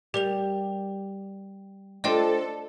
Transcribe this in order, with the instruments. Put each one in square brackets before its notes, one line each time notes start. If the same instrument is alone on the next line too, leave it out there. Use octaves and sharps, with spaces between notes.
[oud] G3 [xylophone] G4 A#4 F7
[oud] D4 F4 C5 [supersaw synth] A4 [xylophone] D5 D#5 G5